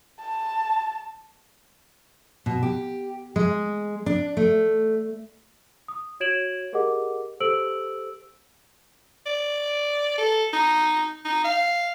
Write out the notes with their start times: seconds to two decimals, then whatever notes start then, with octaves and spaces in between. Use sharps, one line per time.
0.20 A5
2.46 B2
2.63 G4
3.36 G#3
4.06 D4
4.37 A3
5.88 D#6
6.20 F#4 C#5 G#6 D7 E7 F#7
6.73 G4 G#4 A#4 D#5 F#5 D6
7.40 G4 A4 C5 E6 D7 F#7
9.26 D5
10.18 A4
10.53 D#4
11.25 D#4
11.45 F5